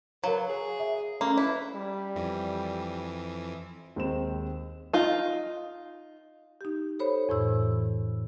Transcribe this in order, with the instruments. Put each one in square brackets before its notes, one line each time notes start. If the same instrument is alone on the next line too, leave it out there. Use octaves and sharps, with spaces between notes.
[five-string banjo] F#3 [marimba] A#4 F5 [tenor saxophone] B4
[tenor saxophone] G#4
[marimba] E5
[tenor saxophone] A3 [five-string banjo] A#3 [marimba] C#4
[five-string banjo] E4 [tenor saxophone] B4
[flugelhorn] G3
[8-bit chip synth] F2 E3
[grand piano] D#2 G#3 C4 C5 E7
[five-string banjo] D#4 F4
[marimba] D#4 G4
A4 C5 C#5 B5
F2 A2 E3 E6